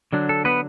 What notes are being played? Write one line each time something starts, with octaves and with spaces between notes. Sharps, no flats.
D3 F#3 D4
A4
B3 B4